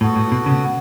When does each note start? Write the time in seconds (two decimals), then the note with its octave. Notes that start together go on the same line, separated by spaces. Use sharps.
0.01 A2 B3 F#4 A4
0.16 A2
0.32 B2
0.46 C#3